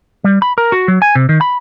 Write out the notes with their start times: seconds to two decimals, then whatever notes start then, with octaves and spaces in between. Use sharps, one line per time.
0.24 G3
0.42 B5
0.58 A#4
0.72 F#4
0.88 F#3
1.02 G#5
1.15 C3
1.29 D#3
1.41 B5